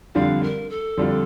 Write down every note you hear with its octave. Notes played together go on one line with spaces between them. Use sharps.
F2 D3 G3 D4 F4 F5
A#4
A4
F2 D3 G3 D4 F4